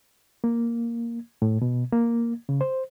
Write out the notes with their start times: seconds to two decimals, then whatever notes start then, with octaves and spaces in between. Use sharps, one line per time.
0.44 A#3
1.42 A2
1.62 B2
1.93 A#3
2.49 C#3
2.61 C5